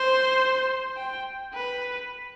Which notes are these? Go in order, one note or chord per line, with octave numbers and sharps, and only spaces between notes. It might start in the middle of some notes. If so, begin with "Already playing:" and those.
Already playing: C5
G5
B4